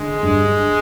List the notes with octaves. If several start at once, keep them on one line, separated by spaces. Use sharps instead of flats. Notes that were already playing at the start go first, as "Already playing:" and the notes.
Already playing: D3 G#3
G2